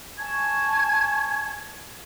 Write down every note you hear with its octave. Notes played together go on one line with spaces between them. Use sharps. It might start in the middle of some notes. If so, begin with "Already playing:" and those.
G#5 A5 C#6 G#6